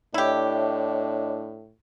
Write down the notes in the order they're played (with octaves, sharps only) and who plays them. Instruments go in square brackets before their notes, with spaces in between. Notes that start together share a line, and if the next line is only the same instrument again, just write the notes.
[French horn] A2 [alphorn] D4 [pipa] E4 G4 [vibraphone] C#5 D#5